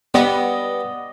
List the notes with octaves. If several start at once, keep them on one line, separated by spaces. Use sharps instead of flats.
G3 B3 D5 D#5